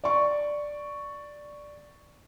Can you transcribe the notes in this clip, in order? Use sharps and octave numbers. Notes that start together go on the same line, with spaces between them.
D5 C#6